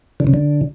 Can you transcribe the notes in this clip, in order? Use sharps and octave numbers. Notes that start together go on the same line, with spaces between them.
D3
C#3
D3